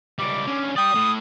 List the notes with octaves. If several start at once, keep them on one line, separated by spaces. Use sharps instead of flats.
C#2 G3 D6
D3 C#4
D5 G5 D#6
A2